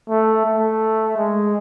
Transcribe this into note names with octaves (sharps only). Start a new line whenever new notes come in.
A3
A3
G#3